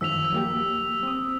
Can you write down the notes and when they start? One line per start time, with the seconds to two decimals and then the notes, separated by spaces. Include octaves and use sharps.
0.01 F#2 D#3 F3 E6 B6 F7
0.33 F#3 A#3 G4
1.03 C4 D#6